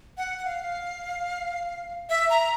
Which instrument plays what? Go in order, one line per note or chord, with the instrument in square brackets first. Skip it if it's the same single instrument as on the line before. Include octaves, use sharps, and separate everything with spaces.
[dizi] F#5
F#5
F5
E5
A#5